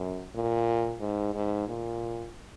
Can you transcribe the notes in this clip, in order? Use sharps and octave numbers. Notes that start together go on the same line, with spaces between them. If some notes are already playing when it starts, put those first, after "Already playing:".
Already playing: F#2
A#2
G#2
G#2
A#2